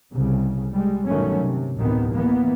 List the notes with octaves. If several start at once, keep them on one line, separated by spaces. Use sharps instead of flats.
C2 C#3
G3 G#3
G2 B2 D#3 F#3 A3 C#4
C3
A1 D2 C3 D#3 B3
E3 A#3 B3